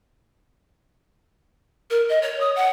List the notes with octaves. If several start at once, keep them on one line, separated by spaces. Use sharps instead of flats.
A#4
D#5
C#5
D#6
F#5